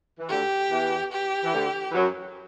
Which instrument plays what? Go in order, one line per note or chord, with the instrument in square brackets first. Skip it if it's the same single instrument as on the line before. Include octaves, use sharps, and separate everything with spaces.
[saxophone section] E3
[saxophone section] D2 D3 [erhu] G4
[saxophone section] E2 E3
[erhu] G4
[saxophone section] E3
D2 D3
E3
F#2 F#3